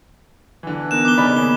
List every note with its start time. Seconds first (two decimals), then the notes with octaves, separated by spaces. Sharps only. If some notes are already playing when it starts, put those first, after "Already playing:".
0.63 D3 E3
0.91 B3 D#4 A#4 F#6 E7
1.05 D6 G7
1.18 C#3 D#4 D5 G#5 B5
1.37 D#2 G7